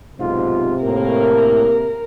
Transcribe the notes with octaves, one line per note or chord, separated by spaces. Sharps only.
B1 G#2 C3 F4
A2 A#3 A#4